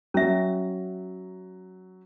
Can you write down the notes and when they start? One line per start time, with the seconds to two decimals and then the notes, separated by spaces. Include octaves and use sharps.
0.14 F#3 C#4 E5